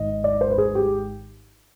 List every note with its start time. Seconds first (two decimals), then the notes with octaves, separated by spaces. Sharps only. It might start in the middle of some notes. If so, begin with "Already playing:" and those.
Already playing: G#1 D#5
0.24 D5
0.41 C5
0.50 B4
0.58 G#4
0.75 G4